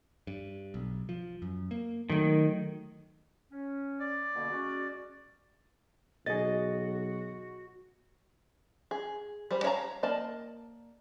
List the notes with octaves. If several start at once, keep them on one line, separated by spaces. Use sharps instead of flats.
G2
B1
F3
F#2
A#3
D#3 F#3 A3
C#4
D5
B2 D3 A#3
G#3 C#4 F#4
B1 F#4 G#4 D#5 A6
G#4
G3 C5
D4 C#5 F5 A5 A#5
A#3 D5 D#5 A5